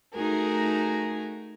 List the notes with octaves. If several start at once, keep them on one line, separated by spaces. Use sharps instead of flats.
A3 D#4 F#4 G#4 A#4